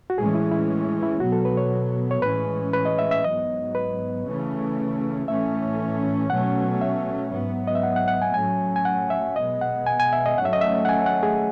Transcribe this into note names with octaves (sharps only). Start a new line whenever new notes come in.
F#4
A2 E3 G#3 C#4 G#4
E4
E4
E4
B2 F#3 B3 F#4
A4
B4
C#5
C#5
A2 E3 G#3 C#4 B4
B4
D#5
E5
E5
G#2 F#3 B3 D#5
B4
C#3 E3 A3 C#4
A2 E3 A3 C#4 E5
B2 F#3 A3 C#4 F#5
E5
G#2 F#3 B3
D#5
E5
F#5
F#5
F#5
G#5
A2 F#3 A3 C#4 G#5
G#5
F#5
E5
B2 G#3 B3 D#5
F#5
G#5
G#5
E5
D#5
G#2 F#3 A3 C#4 F#5
E5
D#5
E5
F#5
G#5
F#5
G#4